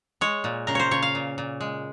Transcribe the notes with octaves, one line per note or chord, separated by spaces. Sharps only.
G#3 C#5
A#2
C#3 A#4
C5 C#5
C#3 C#5
F5
A#2
A#2
G#3